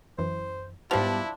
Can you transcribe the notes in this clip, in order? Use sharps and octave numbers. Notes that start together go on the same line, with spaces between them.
F#2 E3 C5
G#2 F3 G3 B3 D4 E4 G4